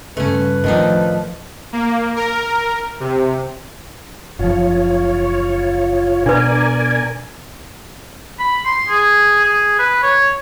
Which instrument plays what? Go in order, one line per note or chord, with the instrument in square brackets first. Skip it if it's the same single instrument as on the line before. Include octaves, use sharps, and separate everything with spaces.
[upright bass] G2 C#3 [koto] A3 C#4 [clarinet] B4
[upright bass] A2 [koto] D#3 D4 D#4 [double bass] F3
[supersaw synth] A#3
A#4
C3
[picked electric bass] F#1 F3 [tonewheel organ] F4 C#5
[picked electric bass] B2 [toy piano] D4 B4 [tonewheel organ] A#4 D5 G#5
[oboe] B5
C6
G#4
G#4
B4
C#5